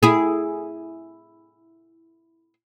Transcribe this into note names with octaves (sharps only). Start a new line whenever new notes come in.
E4 G#4